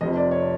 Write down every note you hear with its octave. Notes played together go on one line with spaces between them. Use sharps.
F1 F2 C3 D#5
D5
C#5